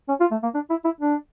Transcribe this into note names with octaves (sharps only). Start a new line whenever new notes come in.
C#4
F4
A3
A#3
D4
E4
E4
D4